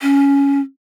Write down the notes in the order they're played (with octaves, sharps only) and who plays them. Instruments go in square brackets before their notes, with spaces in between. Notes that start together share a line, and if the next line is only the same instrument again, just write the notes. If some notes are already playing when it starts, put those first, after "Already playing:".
[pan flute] C#4